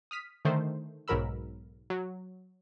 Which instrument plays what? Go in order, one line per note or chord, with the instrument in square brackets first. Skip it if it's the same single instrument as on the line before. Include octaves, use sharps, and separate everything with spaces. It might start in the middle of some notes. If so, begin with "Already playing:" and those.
[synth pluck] D#6 F6 B6 D#7
D3 D#3 A3 C5
B1 G#2 F#3 A#4 B5 E6
F#3